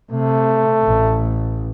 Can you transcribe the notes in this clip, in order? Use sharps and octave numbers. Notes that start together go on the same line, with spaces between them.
C3 A3
A1